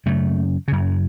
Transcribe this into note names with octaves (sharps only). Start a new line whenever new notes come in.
F#2 C#3 A3
F#2 C#3